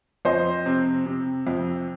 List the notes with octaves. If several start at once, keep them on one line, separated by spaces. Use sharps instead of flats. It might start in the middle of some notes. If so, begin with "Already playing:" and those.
F2 C5 D#5
C3
C3
F2